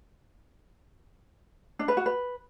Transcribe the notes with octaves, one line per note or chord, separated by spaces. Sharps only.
D4
B4
F#4
B4